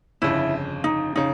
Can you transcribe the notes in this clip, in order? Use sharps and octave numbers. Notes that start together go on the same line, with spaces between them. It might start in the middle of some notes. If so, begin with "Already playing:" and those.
G1 F2 C#3 E4
D#4
C#3 D#4